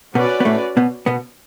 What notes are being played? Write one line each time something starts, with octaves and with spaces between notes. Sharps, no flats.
B2 B3 C#4 F#4 B4 D5
B3
A2 A3
B2 B3
B2 B3